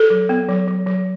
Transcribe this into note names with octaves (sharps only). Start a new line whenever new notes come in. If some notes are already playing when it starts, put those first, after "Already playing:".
Already playing: A4
F#3
B3
F#3
F#3
F#3